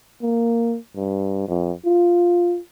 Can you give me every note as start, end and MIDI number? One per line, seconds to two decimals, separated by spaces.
0.22 0.77 58
0.95 1.47 43
1.48 1.72 41
1.85 2.59 65